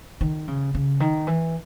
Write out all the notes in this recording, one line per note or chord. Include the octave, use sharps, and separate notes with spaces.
D#3
C#3
C#3
D#3
E3